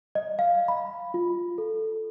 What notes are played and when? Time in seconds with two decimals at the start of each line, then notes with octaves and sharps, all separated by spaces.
0.15 D#5
0.39 F5
0.68 B5
1.14 F4
1.58 A4